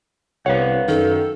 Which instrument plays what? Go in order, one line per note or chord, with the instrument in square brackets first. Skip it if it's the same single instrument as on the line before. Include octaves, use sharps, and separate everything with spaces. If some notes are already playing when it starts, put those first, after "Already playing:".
[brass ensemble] C2 [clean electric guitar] B4 F5 F#5 [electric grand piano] C#5
[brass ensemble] F#2 [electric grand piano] D#3 [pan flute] A4